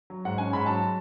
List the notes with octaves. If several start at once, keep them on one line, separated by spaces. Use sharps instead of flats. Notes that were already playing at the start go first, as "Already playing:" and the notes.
F#3
G#2 F#5
C#4 G#5
G#2 B5
F#3 A5